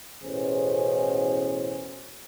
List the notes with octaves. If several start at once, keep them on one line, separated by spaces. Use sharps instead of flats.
A1 E2 B2 C#4 G#4 C5